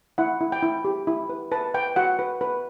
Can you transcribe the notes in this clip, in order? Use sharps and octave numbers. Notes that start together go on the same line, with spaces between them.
E4 F#5
E4
G5
E4
G4
E4
B4
B4 A5
B4 G5
F#4 F#5
B4
B4